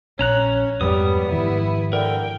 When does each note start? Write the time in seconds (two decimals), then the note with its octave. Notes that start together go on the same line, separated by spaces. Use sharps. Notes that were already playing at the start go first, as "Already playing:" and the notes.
0.19 A#1 C#4 C#5 A#5 F#6
0.81 F2 G#2 G3 B3 D#6
1.31 G#2 D#3 F3 E4
1.93 D3 A#4 G5